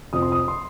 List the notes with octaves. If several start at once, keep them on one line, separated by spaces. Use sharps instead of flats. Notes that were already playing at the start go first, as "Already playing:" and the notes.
F2 C3 F3 C4 D#6
C6
D#6
C6